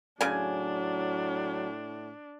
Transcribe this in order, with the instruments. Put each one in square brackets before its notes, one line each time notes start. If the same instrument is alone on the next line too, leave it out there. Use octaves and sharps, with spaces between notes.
[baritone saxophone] A2 [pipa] C#3 G#5 [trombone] F#3 [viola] D4